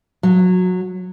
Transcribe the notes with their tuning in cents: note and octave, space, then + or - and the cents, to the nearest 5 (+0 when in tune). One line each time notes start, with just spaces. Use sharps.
F#3 -20